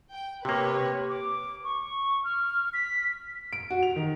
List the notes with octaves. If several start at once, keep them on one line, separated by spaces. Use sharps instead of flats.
G5
C3 A#3 G4 B4 C#5 G5
D6
C#6
F6
B6
D7
F#4
F7
D#3